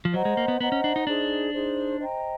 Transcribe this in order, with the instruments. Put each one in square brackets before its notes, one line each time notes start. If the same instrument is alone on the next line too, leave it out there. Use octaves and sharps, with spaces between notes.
[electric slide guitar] F3
[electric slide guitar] F#3 [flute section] C5 D#5 F#5 A#5
[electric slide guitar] G#3
A#3
B3
[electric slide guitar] B3 [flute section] C5 D#5 F#5 A#5
[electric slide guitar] C#4
D4
D#4
[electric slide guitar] D4 [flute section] D#4 G#4 C5
[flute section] D#4 G#4 C5
C5 D#5 G5 A#5